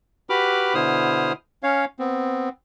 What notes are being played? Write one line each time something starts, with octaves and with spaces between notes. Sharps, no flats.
F#4 G4 B4 B5 D6 F6
B2 D3 E4 C5 D#6 F6
C#4 C#5 F5
B3 C4